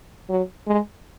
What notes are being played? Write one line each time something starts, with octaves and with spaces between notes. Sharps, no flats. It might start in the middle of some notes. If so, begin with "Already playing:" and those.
F#3
G#3